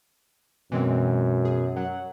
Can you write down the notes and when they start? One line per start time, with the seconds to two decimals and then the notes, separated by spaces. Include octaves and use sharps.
0.72 F#2 B2 E3 G#3 C4
1.45 G#4
1.76 F#3 F#5